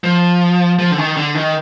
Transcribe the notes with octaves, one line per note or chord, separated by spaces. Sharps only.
F3
F3
D3
D#3
D3
D#3